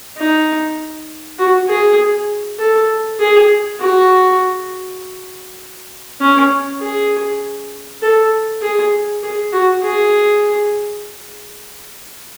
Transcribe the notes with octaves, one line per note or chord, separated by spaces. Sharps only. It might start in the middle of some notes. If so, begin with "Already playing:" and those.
D#4
F#4
G#4
A4
G#4
F#4
C#4
G#4
A4
G#4
G#4
F#4
G#4